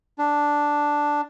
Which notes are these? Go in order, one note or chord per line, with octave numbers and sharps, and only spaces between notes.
D4